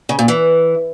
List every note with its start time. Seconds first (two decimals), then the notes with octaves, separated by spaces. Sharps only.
0.09 C#3
0.19 A#2
0.28 E3